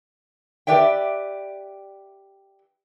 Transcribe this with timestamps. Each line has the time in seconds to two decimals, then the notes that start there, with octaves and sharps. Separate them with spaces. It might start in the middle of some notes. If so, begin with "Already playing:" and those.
0.67 G4 B4 D5 E5 G5